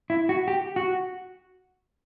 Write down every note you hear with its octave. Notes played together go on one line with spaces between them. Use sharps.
E4
F#4
G4
F#4